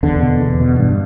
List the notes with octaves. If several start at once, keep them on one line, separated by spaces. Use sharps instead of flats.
E2 D3
B2
E2
B2
G2